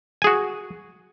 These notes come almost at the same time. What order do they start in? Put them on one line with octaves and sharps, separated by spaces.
G#5 G#4 F#4